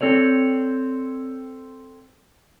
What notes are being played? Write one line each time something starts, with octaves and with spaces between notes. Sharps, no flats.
C4 A4 C#5 D5